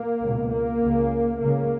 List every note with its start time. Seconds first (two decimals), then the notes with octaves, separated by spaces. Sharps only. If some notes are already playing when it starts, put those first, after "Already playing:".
Already playing: A#3
0.22 C#2 B2
0.52 A#3
0.81 C#2 C#3
1.40 C#2 C#3 A#3